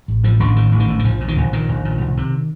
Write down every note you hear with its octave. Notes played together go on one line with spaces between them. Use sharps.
A1
A2 F3
A1 D3
A2 D#3
A1
D#3
A2
D#3
A#1 F3
A#2
D#3
A#1
A#2 D#3
A#1
A#2
C2
C3